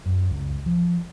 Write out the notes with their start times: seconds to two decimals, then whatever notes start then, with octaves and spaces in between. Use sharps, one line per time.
0.06 F#2
0.31 C#2
0.66 F3